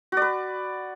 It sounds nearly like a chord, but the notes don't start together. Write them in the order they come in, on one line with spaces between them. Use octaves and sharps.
F#4 D5 B4